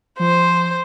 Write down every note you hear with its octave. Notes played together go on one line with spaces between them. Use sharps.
F3 C5